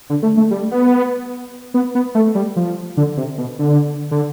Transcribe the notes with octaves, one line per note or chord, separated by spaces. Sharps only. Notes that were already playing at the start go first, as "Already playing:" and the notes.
D3
A3
A3
G3
B3
B3
B3
A3
G3
F3
D3
C3
B2
D3
D3